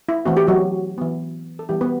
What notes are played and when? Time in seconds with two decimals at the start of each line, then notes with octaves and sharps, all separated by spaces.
0.09 E4
0.25 E3 A3 C4 F#4
0.37 G4
0.47 F#3 F#4
0.98 E3 B3
1.59 A4
1.69 E3 G3 B3 G4
1.81 B3 B4